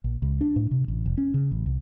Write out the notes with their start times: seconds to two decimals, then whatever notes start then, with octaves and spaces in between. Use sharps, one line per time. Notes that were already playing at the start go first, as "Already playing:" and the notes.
0.04 A#1
0.22 C#2
0.41 D4
0.56 A2
0.71 C3
0.88 A1
1.06 F1
1.18 C#4
1.34 C#3
1.52 A1
1.66 C2